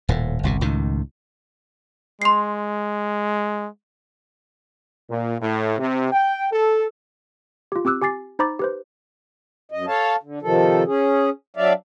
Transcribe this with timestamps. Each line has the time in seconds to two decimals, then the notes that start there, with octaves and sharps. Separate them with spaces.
0.09 D#1 A2
0.43 G1 C2 B2
0.61 C#2 A2 D#3
2.22 G#3 C6 C7
5.10 A#2
5.42 A2
5.79 C3
6.13 G5
6.52 A4
7.72 F4 G4
7.85 C4 G4 D6 E6 F#6
8.02 G4 G#5 D6 A6 C7
8.39 D#4 C5 A#5 B5 D6 A6
8.59 G4 B4 C5
9.72 F#2 D#5
9.87 A4 C#5 F5 A5
10.23 D3
10.42 C3 D#3 F3 A4
10.86 C#4 G#4
11.57 F#3 D4 D5 E5 F5